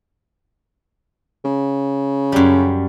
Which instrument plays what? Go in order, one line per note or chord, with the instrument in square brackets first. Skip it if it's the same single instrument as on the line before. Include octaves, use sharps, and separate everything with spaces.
[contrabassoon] C#3
[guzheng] F#2 G3